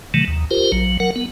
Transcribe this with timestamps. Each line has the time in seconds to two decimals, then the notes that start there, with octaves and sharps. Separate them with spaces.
0.14 C3 D#3 E3 F#3 A3
0.28 D#2
0.51 F4 G4 A#4 C5
0.72 A#1 F#3
1.00 F#3 A#4 F#5
1.16 B3